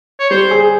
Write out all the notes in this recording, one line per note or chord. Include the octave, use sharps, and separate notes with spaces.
C#5
G3 C5
G#4